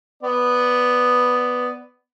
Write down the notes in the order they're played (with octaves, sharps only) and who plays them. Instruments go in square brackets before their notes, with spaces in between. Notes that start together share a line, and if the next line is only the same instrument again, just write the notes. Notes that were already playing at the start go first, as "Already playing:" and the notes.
[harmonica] B3 D5